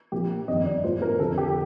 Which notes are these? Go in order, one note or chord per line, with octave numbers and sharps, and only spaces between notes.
A#1 A#2 F3 G4
G1 F2 D#3 D#5
D5
A#1 A2 F3 C5
A#4
F1 F2 D3 A4
G4